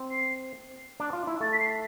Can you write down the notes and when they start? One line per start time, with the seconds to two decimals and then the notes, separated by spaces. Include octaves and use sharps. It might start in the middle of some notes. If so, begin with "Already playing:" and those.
Already playing: C4
0.11 C7
1.00 D4
1.13 F4
1.27 E4
1.40 A3 A6
1.52 B6
1.59 C7